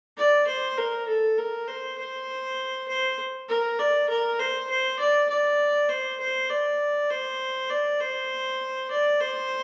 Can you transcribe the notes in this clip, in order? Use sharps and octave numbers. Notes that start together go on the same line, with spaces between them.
D5
C5
A#4
A4
A#4
C5
C5
C5
A#4
D5
A#4
C5
C5
D5
D5
C5
C5
D5
C5
D5
C5
D5
C5